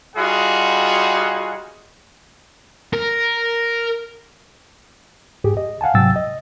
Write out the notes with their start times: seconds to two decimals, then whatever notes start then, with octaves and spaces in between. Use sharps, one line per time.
0.16 G3 D#4 F4 F#4 G#4 F#5
2.93 A#4
5.44 G#2 G4 G#4
5.57 D#5
5.81 F5 F#5 G#5 A5
5.95 G#2 C3 F#3 G5 E6 A6
6.16 D#5